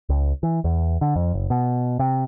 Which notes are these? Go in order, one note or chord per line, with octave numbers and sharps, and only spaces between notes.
C#2
E3
E2
D3
F2
F#1
B2
C3